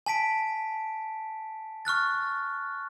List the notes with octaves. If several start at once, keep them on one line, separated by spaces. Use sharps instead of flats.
G#5 A5 B6 D7
C#6 F6 F#6 A6